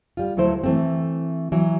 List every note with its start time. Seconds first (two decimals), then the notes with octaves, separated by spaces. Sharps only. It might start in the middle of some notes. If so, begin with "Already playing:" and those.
0.17 G3 F4
0.37 D2 F#3 A3 E4 C5
0.64 E3 A3 C4
1.52 E3 F#3